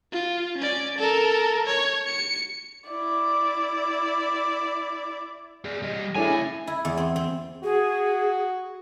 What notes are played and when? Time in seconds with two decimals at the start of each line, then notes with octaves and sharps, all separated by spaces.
0.12 F4
0.58 C#4 D5
0.98 A4 A#4
1.66 C#5
2.07 C#7
2.89 E4 D5
5.65 G#4 D5
5.83 G3 D#5
6.16 A3 D4 E4 G#4 C#5 E5 G#5
6.29 C#3
6.67 E4
6.85 E2
6.97 C4
7.16 C4
7.63 F#4 G#4